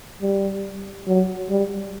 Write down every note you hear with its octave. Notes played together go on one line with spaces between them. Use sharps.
G3
F#3
G3